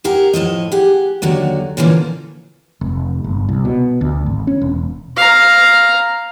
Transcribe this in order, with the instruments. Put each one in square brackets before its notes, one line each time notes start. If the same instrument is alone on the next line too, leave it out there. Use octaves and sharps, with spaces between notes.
[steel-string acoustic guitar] G4 G#4 A#4 F#5
A2 F3 E4 D#5
G4 G#4 F#5
D#2 D3 F#3 F#4
A#2 D3 E3 F3 A#3 C#4
[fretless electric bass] F1
G1
C2
B2
D2
G#1
C#4
E1
[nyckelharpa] F5 A#5